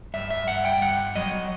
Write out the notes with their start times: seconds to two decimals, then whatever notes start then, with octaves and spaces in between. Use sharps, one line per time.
0.14 G2 E5
0.30 E5
0.47 G2 F#5
0.65 G5
0.81 G2 F#5
1.16 F#3 D#5